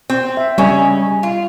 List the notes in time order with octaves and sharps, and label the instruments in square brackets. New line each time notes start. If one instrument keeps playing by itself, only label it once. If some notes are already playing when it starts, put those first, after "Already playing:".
[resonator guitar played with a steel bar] C4
[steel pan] E5
[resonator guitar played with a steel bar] C#3 C#4 [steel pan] G3 D#5 E5
[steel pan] D#5
[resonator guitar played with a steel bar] F4